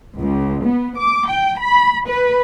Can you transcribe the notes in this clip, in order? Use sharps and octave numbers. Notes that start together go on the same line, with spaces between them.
C#2
B3
D6
G5
B5
B4